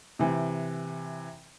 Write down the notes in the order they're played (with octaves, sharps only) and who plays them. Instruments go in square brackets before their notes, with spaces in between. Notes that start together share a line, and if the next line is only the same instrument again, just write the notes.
[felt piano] C3 E3